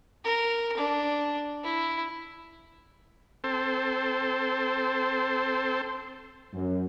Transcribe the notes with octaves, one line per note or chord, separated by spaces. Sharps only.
A#4
D4
E4
C4 A4 C5
F#2